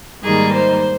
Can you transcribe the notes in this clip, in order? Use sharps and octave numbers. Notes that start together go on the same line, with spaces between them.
G#2 D#3 G3 A#3 D#4 G#4
C5